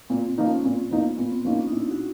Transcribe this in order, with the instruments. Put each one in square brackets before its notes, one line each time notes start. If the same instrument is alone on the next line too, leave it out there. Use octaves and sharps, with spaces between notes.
[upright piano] A#2 [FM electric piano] C4
[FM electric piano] C4
[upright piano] F3 A#3 D#4
[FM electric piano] C#4
[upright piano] A#2 [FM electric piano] C4
[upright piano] F3 A#3 D#4 [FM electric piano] B3
[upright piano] A#2 [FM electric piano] B3
[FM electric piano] C4
[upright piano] F3 A#3 D#4 [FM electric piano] C#4
[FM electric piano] D4
D#4
[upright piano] A#2 [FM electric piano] E4
[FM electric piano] F#4